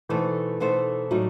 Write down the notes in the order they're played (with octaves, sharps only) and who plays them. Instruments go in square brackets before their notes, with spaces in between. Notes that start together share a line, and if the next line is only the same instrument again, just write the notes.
[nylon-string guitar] B2 A3 D#4 A4 C5 [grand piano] E3
[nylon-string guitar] B2 A3 D#4 A4 C5
[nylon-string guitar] A2 G3 D#4 [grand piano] F#3